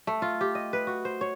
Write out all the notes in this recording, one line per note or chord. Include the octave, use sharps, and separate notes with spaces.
A3
F4
G4
D#5
B4
F#4
C5
C#5